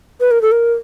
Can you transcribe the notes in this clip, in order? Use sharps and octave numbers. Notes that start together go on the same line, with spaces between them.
B4
A#4
A4
A#4